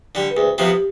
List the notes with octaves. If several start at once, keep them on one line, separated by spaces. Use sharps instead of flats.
D3 G3
B4
D2 G#4
C3 F3 B3
G4